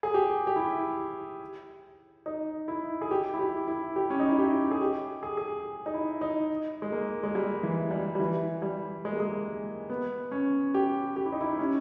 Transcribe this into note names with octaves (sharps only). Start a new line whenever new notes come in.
G#4
G4
G4
E4
D#4
E4
G#4
G4
E4
G4
E4
G4
C#4
D#4
E4
G4
G#4
G4
G#4
G#4
D#4
E4
D#4
G#3
A#3
G#3
G3
E3
G3
G3
E3
G3
G#3
A#3
G#3
B3
C#4
G4
G4
E4
D#4
E4
C#4